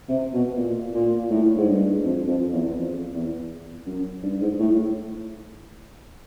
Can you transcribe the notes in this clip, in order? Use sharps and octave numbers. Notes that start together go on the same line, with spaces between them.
C3
B2
A#2
A#2
A2
G#2
G2
F2
F2
E2
F2
E2
F#2
G2
G#2
A2